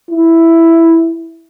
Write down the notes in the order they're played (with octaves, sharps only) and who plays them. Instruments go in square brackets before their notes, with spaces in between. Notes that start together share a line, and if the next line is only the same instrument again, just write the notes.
[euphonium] E4